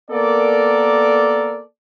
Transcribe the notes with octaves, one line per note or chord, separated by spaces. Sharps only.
A#3 B3 A4 A#4 D5